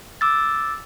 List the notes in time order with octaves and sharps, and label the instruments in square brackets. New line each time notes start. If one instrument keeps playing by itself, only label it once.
[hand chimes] D6 E6 A6